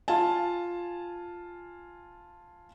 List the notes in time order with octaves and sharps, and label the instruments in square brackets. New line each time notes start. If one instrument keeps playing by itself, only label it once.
[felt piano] F4 G#5 A5